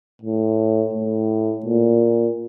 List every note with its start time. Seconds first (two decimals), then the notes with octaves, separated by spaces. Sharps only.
0.22 A2
0.93 A2
1.66 A#2